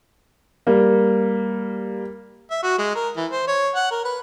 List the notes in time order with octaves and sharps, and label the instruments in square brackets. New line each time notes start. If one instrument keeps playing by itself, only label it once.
[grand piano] G3 A#3
[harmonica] E5
F#4
G#3
A#4
E3
C5
C#5
F#5
A#4
B4